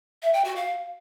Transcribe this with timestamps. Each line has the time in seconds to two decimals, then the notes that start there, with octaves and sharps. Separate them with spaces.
0.22 E5
0.34 G5
0.45 F#4
0.56 F5